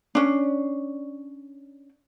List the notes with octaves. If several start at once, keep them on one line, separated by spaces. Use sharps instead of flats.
C#4 D4